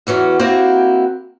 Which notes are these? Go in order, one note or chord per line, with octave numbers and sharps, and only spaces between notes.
E2 E3 F#3 C#4
A#3 C4 E4 F#4 G4